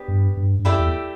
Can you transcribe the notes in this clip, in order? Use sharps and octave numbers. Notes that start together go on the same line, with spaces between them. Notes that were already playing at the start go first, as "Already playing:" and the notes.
Already playing: B3 D4 G4 B4
G2
G2
G2
F#2 A3 E4 G4 D5
E2